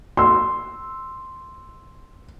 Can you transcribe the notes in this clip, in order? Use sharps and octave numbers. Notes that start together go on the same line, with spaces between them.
C6 E6